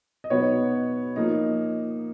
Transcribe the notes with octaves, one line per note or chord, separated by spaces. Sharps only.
D#5
B2 F#3 B3 D#4 C#5
F3 A#3 D#4